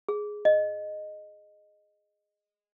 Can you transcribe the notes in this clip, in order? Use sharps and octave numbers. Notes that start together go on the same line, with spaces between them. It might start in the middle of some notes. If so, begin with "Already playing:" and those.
G#4
D#5